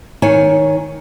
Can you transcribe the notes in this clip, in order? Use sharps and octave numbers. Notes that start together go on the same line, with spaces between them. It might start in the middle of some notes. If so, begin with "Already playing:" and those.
D#3 C#5 G#5